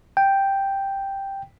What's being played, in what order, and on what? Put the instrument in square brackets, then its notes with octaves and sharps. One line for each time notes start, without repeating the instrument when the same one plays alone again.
[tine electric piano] G5